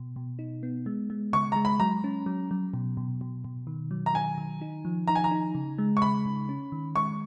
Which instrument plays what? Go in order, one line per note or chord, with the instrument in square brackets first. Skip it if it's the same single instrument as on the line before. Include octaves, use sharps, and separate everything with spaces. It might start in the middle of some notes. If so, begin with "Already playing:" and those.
Already playing: [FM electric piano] B2
B2
D#4
B3
G#3
G#3
[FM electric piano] C#3 [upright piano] C#6
[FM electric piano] G#3 [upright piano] A#5
[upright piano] B5
[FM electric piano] F#3 [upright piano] A#5
[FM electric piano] C#4
F#3
F#3
B2
B2
B2
B2
D#3
F#3
[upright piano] A#5
[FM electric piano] D#3 [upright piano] G#5
[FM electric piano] D#3
D#4
F3
[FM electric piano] D#4 [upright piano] A#5
[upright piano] G#5
A#5
[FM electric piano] D#4
C#3
G#3
[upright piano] C#6
[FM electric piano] C#3 [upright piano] B5
[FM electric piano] C#3
C#4
D#3
[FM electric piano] G#3 [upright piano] C#6